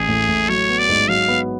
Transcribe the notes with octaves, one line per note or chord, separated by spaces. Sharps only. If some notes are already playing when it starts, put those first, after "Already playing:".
Already playing: A1 G#4
A2
A2
F#3 C#5
B3
D5
G#2
F#3 F5
B3